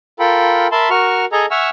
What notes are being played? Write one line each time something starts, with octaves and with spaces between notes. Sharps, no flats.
F4 A4 A#4 G5 B5
A#4 E5 A5 B5 C6
F#4 A#4 C#6 F6
G#4 A4 D#5 G#5 A#5
E5 F#5 G#5 C#6 E6 F6